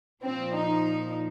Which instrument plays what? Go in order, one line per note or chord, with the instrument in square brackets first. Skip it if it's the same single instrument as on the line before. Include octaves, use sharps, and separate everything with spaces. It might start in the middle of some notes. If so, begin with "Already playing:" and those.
[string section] A#2 F3 C4
D#4